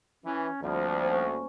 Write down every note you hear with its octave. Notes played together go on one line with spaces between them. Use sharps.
E3 C#4
D2 F3 G3 A#3 C4
C#4